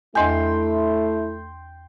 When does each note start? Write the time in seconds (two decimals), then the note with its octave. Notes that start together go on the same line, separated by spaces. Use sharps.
0.15 E2 A3 E4 D#5 G5 G#5 C6